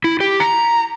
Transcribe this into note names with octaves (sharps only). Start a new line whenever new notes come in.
E4
G4
A#5